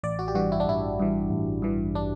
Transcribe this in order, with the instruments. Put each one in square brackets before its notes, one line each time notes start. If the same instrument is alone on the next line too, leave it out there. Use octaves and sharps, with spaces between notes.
[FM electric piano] A1 D5
F#4
G4
G2 E3 F#4
E4
D4
A1 E4
G2 E3
A1
G2 E3
D4